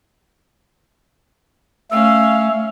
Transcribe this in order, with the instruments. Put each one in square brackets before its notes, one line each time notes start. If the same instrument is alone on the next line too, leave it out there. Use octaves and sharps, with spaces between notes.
[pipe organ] A3 [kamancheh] C#4 F5 [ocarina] E6